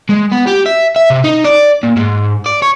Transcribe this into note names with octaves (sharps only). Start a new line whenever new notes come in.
G#3
B3
G4
E5
E5
C3
D#4
D5
A#2
G#2
D5
C#5